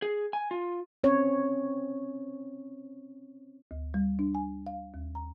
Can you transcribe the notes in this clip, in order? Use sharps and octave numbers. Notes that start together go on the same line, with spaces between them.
G#4
G#5
F4
C4 C#4 C#5
D2
G3
D4
G#5
F5
D#2
A#5